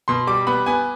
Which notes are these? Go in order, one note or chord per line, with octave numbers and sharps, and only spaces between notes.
B2 C6
G3 D6
B3 B5
B3 G#5